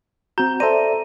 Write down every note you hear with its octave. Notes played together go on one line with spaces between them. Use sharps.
C4 F#4 A#5 G6
A4 C5 D5 E5 A#5 D#7